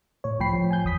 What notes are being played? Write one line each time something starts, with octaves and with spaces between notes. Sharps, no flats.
A2 C#5
C#2 A2 F3 G5 B5 C7
F3
G#5 G6
G#1 E2 D#6 B6